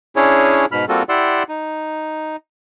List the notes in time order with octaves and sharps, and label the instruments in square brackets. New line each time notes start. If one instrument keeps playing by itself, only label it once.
[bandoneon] C#4 D4 E4 G#4 C#5
G#2 B2 B5 F6
G3 A#3 C4 F4 F#4 A4
E4 G4 D5 F#5 C6 E6
D#4